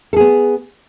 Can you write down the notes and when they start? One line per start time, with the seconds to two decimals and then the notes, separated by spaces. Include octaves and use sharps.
0.13 A4
0.16 G#4
0.20 B3